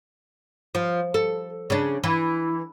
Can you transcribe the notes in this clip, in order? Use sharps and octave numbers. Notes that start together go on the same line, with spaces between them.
F3
A4
C#3 D4
E3